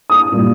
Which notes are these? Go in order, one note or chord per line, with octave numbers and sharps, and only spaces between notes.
D#6
A#2 G3